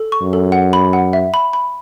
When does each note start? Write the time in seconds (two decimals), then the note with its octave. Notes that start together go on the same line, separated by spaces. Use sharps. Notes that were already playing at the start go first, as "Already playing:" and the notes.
Already playing: A4
0.12 C#6
0.22 F#2
0.33 A4
0.52 F#5
0.73 B5
0.93 F#5
1.13 E5
1.34 B5
1.53 B5